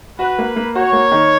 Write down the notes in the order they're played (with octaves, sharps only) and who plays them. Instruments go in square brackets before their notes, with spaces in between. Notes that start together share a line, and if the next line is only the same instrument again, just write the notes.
[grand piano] F#4 [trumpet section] B4
[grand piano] A#3
A#3
[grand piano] F#4 [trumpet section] C#5
[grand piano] A#3
D#3